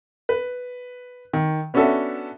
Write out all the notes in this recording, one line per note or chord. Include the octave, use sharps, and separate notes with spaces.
B4
D#3
B3 C#4 D4 F#4 A4 E5